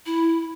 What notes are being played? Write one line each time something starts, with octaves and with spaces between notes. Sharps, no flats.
E4